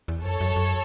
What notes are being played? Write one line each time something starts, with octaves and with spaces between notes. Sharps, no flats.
E2
F#2 A4 C#5
F#2
F#2